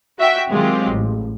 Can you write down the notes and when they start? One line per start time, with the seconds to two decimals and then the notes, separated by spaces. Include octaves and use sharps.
0.19 F#4 E5 G5
0.49 D#3 F#3 G#3 C4 F4 G4
0.88 A1